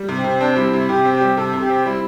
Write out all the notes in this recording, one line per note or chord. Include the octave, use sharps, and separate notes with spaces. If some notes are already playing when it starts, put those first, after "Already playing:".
Already playing: G3
C3
C4
C3
C4 D4
G3 E4
C3 E4
C3 G4
C4
G4
G3
C3 A4
C3
G4
C4
G3 E4